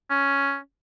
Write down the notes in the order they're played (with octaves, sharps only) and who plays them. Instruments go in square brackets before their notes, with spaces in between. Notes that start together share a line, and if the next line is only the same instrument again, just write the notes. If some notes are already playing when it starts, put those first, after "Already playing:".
[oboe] C#4